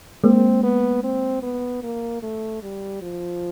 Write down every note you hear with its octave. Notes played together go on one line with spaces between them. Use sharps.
G#3 A#3 C4
B3
C4
B3
A#3
A3
G3
F3